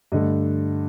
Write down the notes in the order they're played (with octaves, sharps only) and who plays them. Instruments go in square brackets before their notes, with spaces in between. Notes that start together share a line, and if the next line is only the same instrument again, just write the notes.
[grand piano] G2 D3 A3 D#5